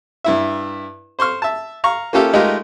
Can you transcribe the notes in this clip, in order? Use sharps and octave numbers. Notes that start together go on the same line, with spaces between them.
G2 E4 E5
C5 C6 C#6 F6
E5 A5
F5 A#5 C#6
A#3 C#4 F4 G4 A4 E5
G#3 A3 D#4 F4 G4 A#4